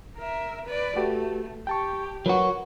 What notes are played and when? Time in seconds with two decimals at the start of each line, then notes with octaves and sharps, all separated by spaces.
0.17 A#4 E5
0.65 B4 D5
0.96 A3 F#4 G4 B4
1.67 G4 G5 A5 C#6
2.26 F#3 F#4 A#4 B4